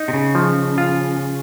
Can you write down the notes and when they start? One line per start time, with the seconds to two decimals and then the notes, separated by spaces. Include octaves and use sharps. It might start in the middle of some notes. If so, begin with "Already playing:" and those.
Already playing: D#4
0.08 C3
0.13 C#3
0.35 F3
0.78 F4